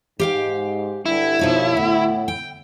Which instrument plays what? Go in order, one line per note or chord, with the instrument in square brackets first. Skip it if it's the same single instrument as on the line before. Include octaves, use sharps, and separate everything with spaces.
[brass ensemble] G#2 [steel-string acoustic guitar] G4 F5 G5
[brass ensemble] G2 D3 G3 [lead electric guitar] E4
[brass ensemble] D#2 F3 [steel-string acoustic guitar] B2 D#4 C#5
[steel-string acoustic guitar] D2 [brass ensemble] A2 F#5
[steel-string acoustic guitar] G5